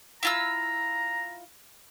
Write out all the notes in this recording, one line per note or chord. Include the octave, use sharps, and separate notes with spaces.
E4 F4 A#5 E6